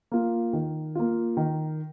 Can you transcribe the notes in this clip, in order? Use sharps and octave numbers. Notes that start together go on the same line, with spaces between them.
A#3 F4
D#3
A#3 F4
D#3